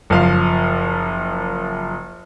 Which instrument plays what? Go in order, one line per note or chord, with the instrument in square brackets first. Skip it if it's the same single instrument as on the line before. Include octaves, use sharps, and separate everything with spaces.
[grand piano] F#1 F3 F5